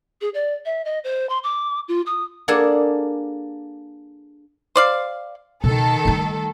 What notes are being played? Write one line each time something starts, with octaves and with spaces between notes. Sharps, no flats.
G#4
D5
E5
D#5
C5
C6
D6
F4
D#6
A#3 D4 G#4 A4 F#5 G#5
C5 D5 F5
B2 D#3 A4
G3 A3